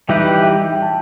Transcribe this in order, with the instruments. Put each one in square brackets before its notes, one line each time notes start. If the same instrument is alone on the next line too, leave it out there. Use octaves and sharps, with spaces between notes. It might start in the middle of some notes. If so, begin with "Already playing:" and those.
[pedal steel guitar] E3 G3 D#4 G4 B4 [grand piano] E5 G5
[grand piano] E5 G5
G5
A5